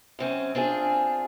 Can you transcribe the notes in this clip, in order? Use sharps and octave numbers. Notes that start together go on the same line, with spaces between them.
F#2 C4 C#4
C4 D4 F4 G#4